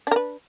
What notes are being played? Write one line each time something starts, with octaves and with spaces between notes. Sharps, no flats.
D4 A#4 B4